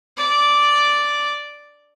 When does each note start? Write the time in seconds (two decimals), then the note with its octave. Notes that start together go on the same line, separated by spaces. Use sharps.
0.17 D5